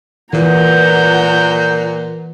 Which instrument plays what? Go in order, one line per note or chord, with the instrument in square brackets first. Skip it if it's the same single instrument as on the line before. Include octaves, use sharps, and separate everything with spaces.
[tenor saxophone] A#2 [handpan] E3 [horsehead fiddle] F#5 A#5 [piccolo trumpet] G6